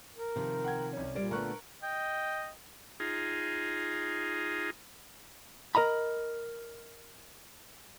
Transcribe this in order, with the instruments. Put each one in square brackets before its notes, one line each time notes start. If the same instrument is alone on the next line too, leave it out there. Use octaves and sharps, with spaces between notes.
[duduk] A#4
[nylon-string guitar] C3 D#3 F3
[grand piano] F#5 G5 G#6
C2 C#4
[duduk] A#2 [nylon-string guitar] G3 A#4 C5 [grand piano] D5 D7
[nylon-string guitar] D3 A3 B3 [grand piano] A#4 C#6 F#6
[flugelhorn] D#5 [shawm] G5
[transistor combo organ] D#4 F4 G#4
[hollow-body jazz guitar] A#4 D#5 A#5 B5